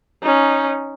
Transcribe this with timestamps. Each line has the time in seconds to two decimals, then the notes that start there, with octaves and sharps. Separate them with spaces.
0.22 C#4 D#4